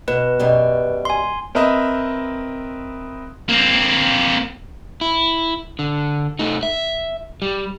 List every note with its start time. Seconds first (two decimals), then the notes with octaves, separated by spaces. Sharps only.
0.08 B2 B4
0.39 F#2 B2 G3
1.05 G#5 C6
1.55 C4 A#4 B4 D#5 E5
3.49 A#3 C4
5.01 E4
5.79 D3
6.39 A3 D#4
6.63 E5
7.42 G3